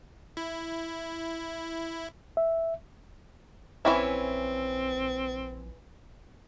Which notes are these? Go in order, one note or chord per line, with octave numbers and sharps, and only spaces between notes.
E4
E5
A#1 E3 C4 C#4 E4